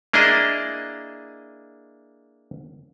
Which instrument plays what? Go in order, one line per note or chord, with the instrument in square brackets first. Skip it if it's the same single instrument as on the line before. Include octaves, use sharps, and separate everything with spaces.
[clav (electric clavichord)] A#3 D4 E4 G#4 D#5